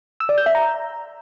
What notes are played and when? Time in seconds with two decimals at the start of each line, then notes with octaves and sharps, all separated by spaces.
0.20 E6
0.29 D5
0.38 G6
0.46 E5
0.55 A#5